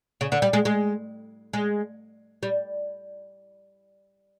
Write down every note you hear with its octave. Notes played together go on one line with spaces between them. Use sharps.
C#3
D3
G3
G#3
G#3
G#3
G3